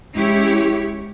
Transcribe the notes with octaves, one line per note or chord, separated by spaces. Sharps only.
G#3 C#4 E4 G4 C#5